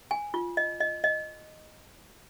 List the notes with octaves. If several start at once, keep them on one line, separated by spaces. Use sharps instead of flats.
G#5
F4
D#5
D#5
D#5